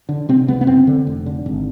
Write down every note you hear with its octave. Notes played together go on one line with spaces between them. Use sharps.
D3
C3 C4
C#2 B3
B3
F#1 C4
D3
F1
D3
G#1